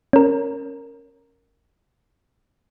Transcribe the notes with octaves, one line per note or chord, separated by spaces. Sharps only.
C#4 A#4